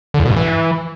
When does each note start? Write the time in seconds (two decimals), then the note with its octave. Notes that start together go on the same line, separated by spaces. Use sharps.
0.14 D3
0.20 E2
0.25 B2
0.31 G2
0.36 E3